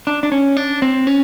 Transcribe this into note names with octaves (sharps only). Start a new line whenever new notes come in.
D4
D4
C#4
D4
C4
C#4